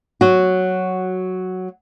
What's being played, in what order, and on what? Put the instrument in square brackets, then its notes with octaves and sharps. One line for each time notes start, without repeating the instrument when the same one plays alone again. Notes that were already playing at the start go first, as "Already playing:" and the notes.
[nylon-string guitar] F#3 F#4